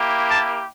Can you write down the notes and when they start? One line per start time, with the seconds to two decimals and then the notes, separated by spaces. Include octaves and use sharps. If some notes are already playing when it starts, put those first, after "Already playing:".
Already playing: A#3 E4 G4
0.30 A5